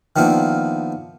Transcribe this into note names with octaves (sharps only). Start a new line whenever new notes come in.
D#3 F3 A#3 B3 D4 E4